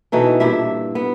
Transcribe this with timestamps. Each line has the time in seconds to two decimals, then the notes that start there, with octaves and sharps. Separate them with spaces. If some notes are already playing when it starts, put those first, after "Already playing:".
0.12 B2 E3 D#4 A4
0.40 G2 A#2 E4 E5
0.95 B3